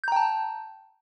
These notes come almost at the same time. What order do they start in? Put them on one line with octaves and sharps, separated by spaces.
G6 A#5 G5 A5